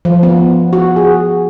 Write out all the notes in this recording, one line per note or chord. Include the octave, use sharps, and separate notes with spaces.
F3
B3
F#4
G#4